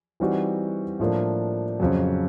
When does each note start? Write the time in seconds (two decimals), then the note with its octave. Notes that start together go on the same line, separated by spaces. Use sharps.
0.20 E3 G3 C4 D#4 F#4
1.00 A2 F3 A#3 D4
1.80 F2 C#3 F#3